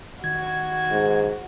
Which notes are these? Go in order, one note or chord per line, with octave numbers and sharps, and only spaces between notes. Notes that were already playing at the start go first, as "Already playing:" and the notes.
D#3 F#4 G#6
G#2